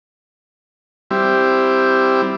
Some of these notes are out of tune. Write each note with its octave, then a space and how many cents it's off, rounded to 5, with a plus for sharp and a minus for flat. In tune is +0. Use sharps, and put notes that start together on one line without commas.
G3 +0 C4 +0 E4 +0